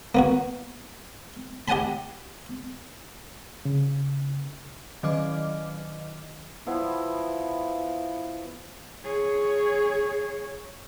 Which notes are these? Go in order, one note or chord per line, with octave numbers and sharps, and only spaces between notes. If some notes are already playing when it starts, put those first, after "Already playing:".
A#3 B3 F#4
G4 D#5 F#5 G#5 A5 B5
C#3
D#3 F#3 D#5 D6 F6
F3 B3 E4
G#4 C#5